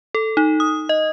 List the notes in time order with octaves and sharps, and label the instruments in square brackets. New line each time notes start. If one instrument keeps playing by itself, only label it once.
[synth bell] A4
D#4
D#6
D#5